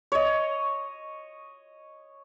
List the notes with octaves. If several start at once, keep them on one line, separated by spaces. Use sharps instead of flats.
C#5 D#5